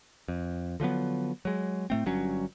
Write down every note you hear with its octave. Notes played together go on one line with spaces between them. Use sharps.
F2
D3 F3 F#3 B3
F#3 G#3
A2 A3 C4
G1 G2 F#3 C#4